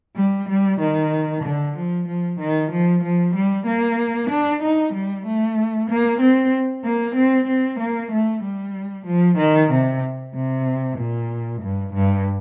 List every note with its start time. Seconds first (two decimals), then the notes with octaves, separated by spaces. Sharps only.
0.16 G3
0.49 G3
0.80 D#3
1.43 D3
1.76 F3
2.07 F3
2.38 D#3
2.70 F3
3.02 F3
3.34 G3
3.66 A#3
4.29 D4
4.61 D#4
4.93 G3
5.25 A3
5.89 A#3
6.20 C4
6.84 A#3
7.15 C4
7.47 C4
7.79 A#3
8.11 A3
8.42 G3
9.06 F3
9.38 D#3
9.70 C3
10.33 C3
10.97 A#2
11.61 G2
11.93 G2